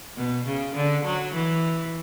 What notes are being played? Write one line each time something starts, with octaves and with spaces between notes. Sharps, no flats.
B2
C#3
D3
F#3
E3